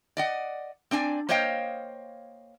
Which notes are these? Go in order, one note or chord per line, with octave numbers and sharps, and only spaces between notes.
D5 D#5 F#5
C4 D4 D5 G#5
A#3 C5 C#5 D#5 F5 G5